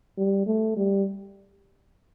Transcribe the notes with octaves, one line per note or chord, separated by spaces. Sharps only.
G3
A3
G3